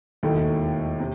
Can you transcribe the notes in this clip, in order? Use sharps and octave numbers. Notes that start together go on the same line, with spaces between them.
E1 D#2 D#3 A3 E4
C3